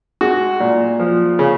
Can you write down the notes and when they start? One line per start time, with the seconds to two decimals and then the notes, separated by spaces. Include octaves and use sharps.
0.21 G#3 F#4
0.60 A#2
1.00 F3
1.39 C#3